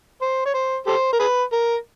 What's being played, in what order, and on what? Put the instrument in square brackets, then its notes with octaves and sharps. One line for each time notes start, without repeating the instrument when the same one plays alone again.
[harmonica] C5
C#5
C5
G4 A4 C5
A#4
G#4 B4
A#4